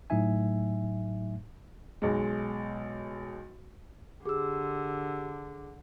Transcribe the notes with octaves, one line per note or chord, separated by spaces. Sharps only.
A2 F#3 A3 D#4 E5 G#5
B1 G#3
D3 G4 G#4 D6 E6